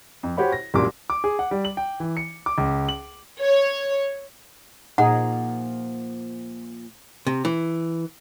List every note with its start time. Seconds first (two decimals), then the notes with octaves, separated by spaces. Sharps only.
0.23 F2
0.37 F#4 G4 C5 C#5 F#5 B5
0.52 A#6
0.74 C2 F#2 A#2 G3 D6
1.10 D6
1.24 G#4
1.39 F#5
1.51 G3
1.65 F#7
1.77 G5
2.00 E3
2.17 C#7
2.46 D6
2.58 C#2
2.89 F#7
3.42 C#5
4.98 A#2 F3 D#4 G#4 F#5
7.27 C3
7.45 E3